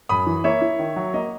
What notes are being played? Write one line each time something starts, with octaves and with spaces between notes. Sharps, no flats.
F#2 B5 D#6
E3
A#3 C#5 E5
E4
D#3
F#3
A#3 D#5